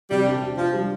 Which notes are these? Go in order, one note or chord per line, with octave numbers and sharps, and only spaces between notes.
C3 G3
D4
C3
F3 D4
G3